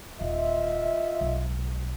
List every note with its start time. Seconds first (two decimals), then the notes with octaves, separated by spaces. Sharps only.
0.21 D#1 F4 D#5 E5
1.21 B1 G#3